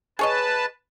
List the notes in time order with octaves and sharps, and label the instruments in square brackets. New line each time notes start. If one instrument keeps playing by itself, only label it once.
[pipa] G#4 C#5 D#5 [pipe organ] B4 A5